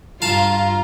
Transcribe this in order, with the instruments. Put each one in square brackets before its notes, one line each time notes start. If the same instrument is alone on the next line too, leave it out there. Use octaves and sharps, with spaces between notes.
[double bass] G2 [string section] F4 [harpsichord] F5 A5 [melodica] A#5